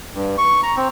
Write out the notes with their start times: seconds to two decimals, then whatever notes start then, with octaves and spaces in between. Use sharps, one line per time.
0.15 G2
0.38 C#6
0.63 A#5
0.77 C4